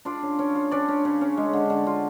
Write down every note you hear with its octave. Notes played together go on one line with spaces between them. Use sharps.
D4 F4 D5
C#3
C#4
F4
C#4 D4 D5
C#4
C#3
C#4
G#3
D3
D3
F4